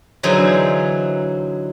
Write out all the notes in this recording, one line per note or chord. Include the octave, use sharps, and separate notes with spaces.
D3 E3 F#3 D#4 G#4 C5